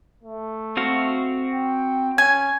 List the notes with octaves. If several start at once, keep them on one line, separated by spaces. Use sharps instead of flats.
A3
C4 F#4 F5
G5
C#4 G#5 G#6